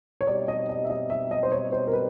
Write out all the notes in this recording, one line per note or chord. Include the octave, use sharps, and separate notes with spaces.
C#5
B2 G3 C4 D#4 G4 D5
D#5
D#5
E5
D#5
E5
D#5
C5
C#5
C5
A#4
B4